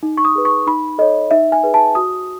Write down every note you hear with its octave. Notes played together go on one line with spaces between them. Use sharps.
D#4
C#6
D#6
G#4 B4
C#6
D#4 B5
A4 C#5 D#5
D#4 E5
G#5
G#4 B4
A5
F#4 D#6